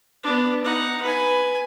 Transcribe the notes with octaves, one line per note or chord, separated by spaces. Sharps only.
B3 D4
D#4 F#5
B4 G#5